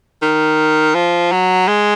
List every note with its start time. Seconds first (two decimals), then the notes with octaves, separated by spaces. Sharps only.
0.22 D#3
0.95 F3
1.32 F#3
1.68 G#3